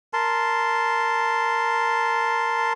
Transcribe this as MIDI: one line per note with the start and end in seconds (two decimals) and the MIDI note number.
0.13 2.73 70
0.13 2.73 81
0.13 2.73 84